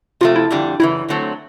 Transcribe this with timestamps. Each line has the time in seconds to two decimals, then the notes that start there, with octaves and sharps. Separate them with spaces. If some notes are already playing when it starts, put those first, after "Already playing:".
0.21 C3 F3 A3 F4
0.36 E4
0.51 F2 D3 G3
0.80 F#2 C#3 E3 E4
1.08 D3 F#3 A3 C4